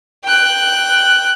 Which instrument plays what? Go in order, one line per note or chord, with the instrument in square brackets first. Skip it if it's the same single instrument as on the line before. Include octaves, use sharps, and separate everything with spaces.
[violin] G5 F#6